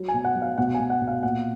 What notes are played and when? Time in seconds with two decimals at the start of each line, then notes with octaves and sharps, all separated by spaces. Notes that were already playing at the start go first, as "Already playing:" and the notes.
Already playing: F#3
0.08 G#5
0.14 B2
0.25 F#5
0.35 F#3
0.42 F5
0.58 B2 F#5
0.74 G#5
0.80 B2
0.90 F#5
1.01 B2
1.08 F5
1.23 A#2 F#5